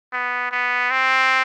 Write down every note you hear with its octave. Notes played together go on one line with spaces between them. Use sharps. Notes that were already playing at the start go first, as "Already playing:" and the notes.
B3
B3
C4